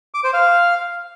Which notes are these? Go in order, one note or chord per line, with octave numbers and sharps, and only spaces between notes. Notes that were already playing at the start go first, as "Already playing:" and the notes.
D6
C5
F5